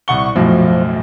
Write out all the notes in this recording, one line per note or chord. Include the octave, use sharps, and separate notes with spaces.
C2 F#5 C#6 G7
B1 F#2 A2 F3